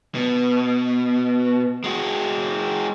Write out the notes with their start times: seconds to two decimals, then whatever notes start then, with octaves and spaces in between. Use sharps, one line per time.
0.15 B2
1.84 G#3 F#4